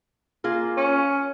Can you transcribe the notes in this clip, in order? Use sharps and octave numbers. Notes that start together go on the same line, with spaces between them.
A#3 F4 G#4
C#4